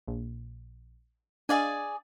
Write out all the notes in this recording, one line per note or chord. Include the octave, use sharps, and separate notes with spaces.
A#1
D4 G#4 D5 D#5 F5 G#5